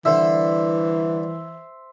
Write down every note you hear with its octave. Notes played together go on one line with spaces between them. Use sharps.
D3 E3 G3 C5 E5